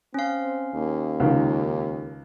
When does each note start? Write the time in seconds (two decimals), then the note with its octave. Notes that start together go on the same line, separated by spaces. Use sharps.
0.14 C4 C#4 F5
0.74 D#2
1.20 C#2 D#3